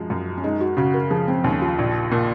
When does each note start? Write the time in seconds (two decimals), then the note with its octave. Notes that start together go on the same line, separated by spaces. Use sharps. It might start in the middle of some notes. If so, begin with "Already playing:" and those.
Already playing: F#2 F3 G#3 F4
0.10 F#2
0.37 C#4
0.44 G#3 D#4
0.60 F#4
0.77 C#3 F#4
0.94 A#4
1.10 F3 G#4
1.28 C4
1.44 D#2 C#4
1.62 F4
1.79 A#1
2.12 A#2